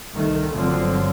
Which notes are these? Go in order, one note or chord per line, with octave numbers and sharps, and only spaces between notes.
C2 D#3 A3
G1 D3 F3 F#3 C4